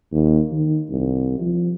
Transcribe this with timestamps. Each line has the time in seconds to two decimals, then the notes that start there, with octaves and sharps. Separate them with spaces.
0.12 D#2
0.52 D#3
0.90 C2
1.40 F3